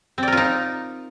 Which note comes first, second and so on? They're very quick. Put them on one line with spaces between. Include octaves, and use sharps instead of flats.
C4 D5 A#4 F4 D#4